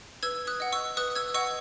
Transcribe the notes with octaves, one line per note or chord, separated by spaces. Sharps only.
B4 E6 G#6
D#6 F#6
D#5 F#5
C#6 E6
B4 D#6 F#6
E6 G#6
D#5 F#5 C#6 E6